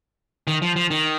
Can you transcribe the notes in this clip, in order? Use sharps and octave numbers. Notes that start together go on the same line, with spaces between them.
D#3
F3
F3
D#3